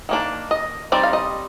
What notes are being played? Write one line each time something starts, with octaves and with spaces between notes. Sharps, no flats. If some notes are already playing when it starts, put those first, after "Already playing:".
D#3 A#3 D4
D#5
G3 C4 D#4 D5
F5
D#5